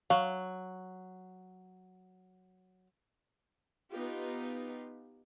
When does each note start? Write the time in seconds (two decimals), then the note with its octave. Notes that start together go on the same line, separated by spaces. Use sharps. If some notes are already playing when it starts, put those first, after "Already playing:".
0.10 F#3 F5
3.91 B3 D#4 F4 G4